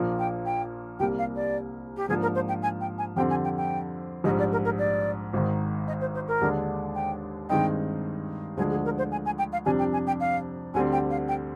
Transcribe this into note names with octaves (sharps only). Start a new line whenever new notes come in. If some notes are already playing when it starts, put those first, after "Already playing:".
Already playing: A#1 A#2 F3 A#3
G5
G5
C2 C3 G3 A#3 G5
F5
D5
G4
G#2 F3 A#3 D4 G#4
A#4
C5
G5
G#5
G5
G#5
F2 D3 G3 C4 G5
G#5
G5
G5
A#1 G#2 G3 D#5
D5
A#4
A#4
D5
G#1 G#2 D#3
D#5
C5
C5
A#4
D#2 D3 G#3 D4
G5
G2 D#3 G#3 C4 D#4 G5
D2 D3 F3 G#3 D4 G#4
G#4
A#4
C5
G#5
G#5
G5
F5
F2 C3 G3 D4 G#5
G5
G#5
G5
F5
D2 D3 G3 C4 G#5
G5
F5
G5